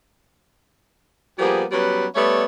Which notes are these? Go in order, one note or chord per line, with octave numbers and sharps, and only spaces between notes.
F3 G3 A#3 B3 G4 G#4
F#3 G3 B3 C#4 B4
G3 A3 B3 C#5 D5 E5